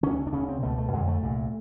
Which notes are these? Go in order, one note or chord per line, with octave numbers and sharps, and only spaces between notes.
D2 C#3 C#4
D4
D2 C#3 C#4
C4
C#2 B2 A3
A3
F2 D3 G#3
A3
C2 A#2